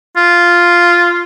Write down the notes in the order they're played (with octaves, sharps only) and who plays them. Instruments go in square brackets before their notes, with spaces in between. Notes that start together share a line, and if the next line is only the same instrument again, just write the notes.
[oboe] F4